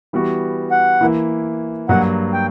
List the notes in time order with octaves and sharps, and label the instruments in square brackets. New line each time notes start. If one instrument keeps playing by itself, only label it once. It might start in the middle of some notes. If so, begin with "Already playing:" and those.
[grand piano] E3 G3 B3 F#4
[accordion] F#5
[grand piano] E3 A#3 E4
[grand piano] G2 F#3 A#3 [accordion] F#5
[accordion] G5